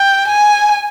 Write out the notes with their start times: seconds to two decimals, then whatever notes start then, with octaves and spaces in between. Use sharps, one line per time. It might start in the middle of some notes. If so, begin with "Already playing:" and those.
Already playing: G5
0.27 G#5